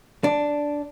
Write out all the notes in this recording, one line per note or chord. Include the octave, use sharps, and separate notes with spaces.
D4